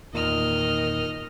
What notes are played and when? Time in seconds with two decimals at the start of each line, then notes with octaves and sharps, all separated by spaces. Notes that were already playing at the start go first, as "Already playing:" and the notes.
0.14 E2 A#2 D#3 D#5 F6